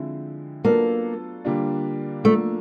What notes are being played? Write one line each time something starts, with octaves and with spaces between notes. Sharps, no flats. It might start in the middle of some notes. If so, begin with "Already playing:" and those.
Already playing: D3 F3 G#3 C4 E4
F#3 A#3 B3 D4 F4 A4
D3 G3 A#3 D4 F4
F3 A3 A#3 D4